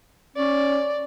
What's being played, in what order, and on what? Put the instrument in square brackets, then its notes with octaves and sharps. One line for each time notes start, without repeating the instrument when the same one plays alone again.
[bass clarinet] C#4 [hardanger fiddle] D5